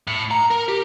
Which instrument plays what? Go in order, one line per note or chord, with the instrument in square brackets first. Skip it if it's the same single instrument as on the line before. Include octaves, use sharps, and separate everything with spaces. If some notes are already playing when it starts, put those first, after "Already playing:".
[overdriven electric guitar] A2
A#5
A#4
G4